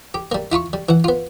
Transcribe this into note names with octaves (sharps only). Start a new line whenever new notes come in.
G4
G3 A#3
E4 F4 B5 C#6
G3
E3 F#5
B3 F4